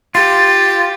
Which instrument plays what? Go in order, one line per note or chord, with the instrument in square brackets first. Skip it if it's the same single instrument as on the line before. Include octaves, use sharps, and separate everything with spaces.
[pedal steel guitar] F4 [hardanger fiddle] G4 [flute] A6